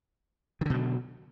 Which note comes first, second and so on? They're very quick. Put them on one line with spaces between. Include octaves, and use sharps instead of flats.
D#3 D3 B2 F#3